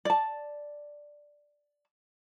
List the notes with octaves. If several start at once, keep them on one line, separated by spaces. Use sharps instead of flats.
D5 A5